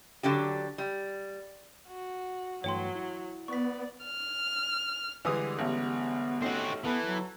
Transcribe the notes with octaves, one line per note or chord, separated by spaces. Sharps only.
D3 F#3 D4 G4
G3
F#4
G2 E3 F#3 A3 C#5 G5 C6
E4
B3 D5 C#6 B6
F6
D3 E3 G3 G#3 D#6
A1 B3
A3 C4 C#4 D#4 F#4
E3 B3 E4 A4 B4
F#3